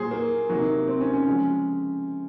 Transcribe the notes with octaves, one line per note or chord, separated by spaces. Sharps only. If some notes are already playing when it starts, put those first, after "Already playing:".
Already playing: A#2 F#3 G#4 C5
A#3
C3 D#3 F#3 A#3
C4
C#4
C#4
C#3 F3 G#3